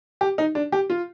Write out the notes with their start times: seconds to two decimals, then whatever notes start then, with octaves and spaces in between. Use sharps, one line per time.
0.21 G4
0.38 D#4
0.55 D4
0.72 G4
0.90 F4